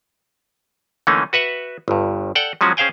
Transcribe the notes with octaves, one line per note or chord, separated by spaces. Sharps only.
D3 E3 A3 A#3 C#4 D#4
F#4 B4 E5 F#5
G1 G2
A4 D5 F#5 G5
F3 F#3 G#3 C#4 F#4
C#4 G#4 C5 F5 G5 G#5